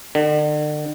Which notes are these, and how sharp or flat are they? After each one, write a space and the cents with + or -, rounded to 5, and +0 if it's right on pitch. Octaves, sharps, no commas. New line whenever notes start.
D3 +40